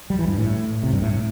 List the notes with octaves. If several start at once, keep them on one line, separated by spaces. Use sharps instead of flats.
G3
E3
G2
A2
C3
G2
A2